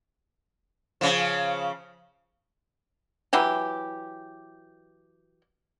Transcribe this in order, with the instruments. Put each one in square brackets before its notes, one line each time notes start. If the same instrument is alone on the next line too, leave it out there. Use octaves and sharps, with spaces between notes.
[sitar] C#3 F3
[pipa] E3 F#3 E4 G4